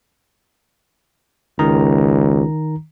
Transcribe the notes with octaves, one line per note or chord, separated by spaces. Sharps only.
C#2 D#3 A#5